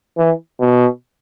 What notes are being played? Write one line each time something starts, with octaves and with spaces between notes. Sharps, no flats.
E3
B2